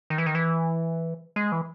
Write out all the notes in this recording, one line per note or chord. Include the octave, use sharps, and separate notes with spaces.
D#3
E3
D#3
E3
G#3
E3